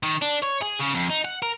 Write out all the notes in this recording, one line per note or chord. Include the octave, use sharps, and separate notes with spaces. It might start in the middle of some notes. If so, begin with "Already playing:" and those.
D#3
D4
C#5
G#4
C#3
F2
D#4
F#5
A#4